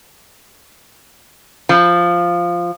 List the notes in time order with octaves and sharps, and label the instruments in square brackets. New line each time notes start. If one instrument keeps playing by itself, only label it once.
[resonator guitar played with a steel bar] F3